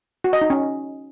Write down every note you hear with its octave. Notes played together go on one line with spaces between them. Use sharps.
F#4
D#5
D#4
C#4